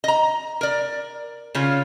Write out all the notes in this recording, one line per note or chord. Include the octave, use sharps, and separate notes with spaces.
D#5 A#5
A#4 D5
C#3 C#4 F4